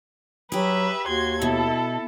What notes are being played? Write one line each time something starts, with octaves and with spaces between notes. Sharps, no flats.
F#3 G4 G#4 B4 E5
D#2 F#4 C6 G#6
B2 E4 A4 A5